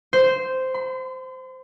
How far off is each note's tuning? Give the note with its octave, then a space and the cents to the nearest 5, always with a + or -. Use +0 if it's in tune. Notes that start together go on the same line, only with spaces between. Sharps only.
C5 -10
C6 -40